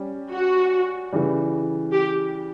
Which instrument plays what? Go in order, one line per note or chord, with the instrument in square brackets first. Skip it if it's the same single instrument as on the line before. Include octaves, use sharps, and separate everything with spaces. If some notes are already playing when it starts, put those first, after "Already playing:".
Already playing: [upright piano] G3 C#4 G4
[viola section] F#4
[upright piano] C#3 E3 G3
[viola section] G4